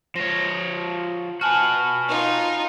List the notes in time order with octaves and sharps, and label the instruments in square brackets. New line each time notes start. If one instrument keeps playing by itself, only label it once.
[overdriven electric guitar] F3 C#5 [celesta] A#6
[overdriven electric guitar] F#4 B4 [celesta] G#5 A5 F6
[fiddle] D#4 F4